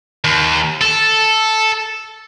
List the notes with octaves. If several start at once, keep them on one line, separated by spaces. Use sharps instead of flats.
D#2
A4